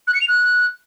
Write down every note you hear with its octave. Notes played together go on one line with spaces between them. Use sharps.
F#6
C#7
F7
F#6